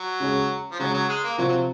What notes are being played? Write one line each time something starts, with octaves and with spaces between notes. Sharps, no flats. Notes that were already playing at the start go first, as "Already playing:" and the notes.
Already playing: F#3
C#3 G#3 C#4 G#4
F3
C#3 F#3 G#3 C#4 G#4
F#3
G#3
A#3
C3 F3 F#3 C4 F4
F#3